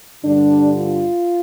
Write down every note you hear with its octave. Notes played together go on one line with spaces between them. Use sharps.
G2 D3 G3 D4
F4